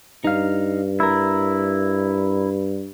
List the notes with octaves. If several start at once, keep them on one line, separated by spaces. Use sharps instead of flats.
G2 D#4 F5
E4 A#4